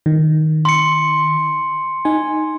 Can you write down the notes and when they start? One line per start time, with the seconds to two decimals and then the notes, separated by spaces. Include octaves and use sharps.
0.06 D#3
0.65 C6 C#7
2.05 D#4 G#5